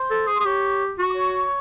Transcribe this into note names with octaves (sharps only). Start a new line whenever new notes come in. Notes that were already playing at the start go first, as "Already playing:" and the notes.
Already playing: C5 C6
A4
G#4
C6
G#4
G4 C#5 C#6
F#4 C#6
D6
C#5 C#6